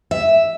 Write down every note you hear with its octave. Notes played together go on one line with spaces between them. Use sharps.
E5